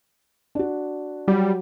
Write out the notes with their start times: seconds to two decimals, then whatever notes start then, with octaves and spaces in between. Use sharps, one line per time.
0.55 D4 F#4
1.28 F#3 G3